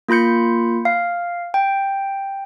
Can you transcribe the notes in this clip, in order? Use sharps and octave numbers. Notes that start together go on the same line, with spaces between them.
A#3 F4 B5 G6 C#7
F5
G5